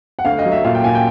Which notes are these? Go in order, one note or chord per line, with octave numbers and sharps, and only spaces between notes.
F#5
D2 F5
D#5
F#3
E5
A#2 F5
G5
A#2 G#5
G5